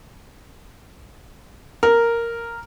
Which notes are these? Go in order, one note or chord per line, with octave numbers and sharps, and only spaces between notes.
A#4